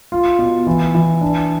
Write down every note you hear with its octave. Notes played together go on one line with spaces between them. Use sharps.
F4
B2
E3
E3
D4